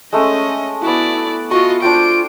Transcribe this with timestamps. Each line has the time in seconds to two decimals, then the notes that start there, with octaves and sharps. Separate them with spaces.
0.12 G#3 A3 C#4 D#5
0.82 B3 E4 F#4 D5
1.51 F4 F#4 D#5 C#6
1.82 D4 F4 C5 G5 D7